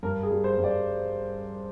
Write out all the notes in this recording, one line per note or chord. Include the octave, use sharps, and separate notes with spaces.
G2 A#4
G#4
G3
C5
G2
D5